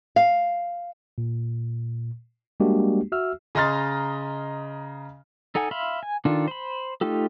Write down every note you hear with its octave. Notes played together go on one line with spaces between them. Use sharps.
F5
A#2
G3 G#3 A#3 D4 F#4 G4
F#4 E5 E6 F6
C#3 D#5 A#5 C6 F6 A6
D#4 A4 F#5 G#5
E5 F5 B5 C6
G#5
D#3 D4 F4 A4
C5 B5
A3 D#4 F4 G4 A4